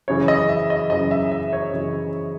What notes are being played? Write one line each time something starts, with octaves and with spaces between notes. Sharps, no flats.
F#2 C#3 E3 C#5
D#5
E5
D#5
F#2 C#3 E3 D#5
E5
E5
C#5
F#2 C#3 E3